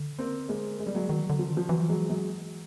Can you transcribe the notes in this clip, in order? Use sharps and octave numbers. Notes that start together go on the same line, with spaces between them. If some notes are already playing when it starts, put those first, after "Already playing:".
Already playing: D3
A#3 C4
G#3 A#3
G#3
G3
F#3 G#3
D#3 F#3
D3
F3
D#3
F3
E3 F#3
F#3 G#3
F#3 G#3